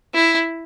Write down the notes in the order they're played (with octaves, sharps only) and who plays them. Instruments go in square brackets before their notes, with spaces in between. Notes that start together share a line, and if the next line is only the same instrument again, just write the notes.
[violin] E4